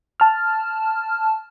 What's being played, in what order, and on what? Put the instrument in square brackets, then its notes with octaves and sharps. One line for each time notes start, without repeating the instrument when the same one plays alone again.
[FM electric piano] A5 F6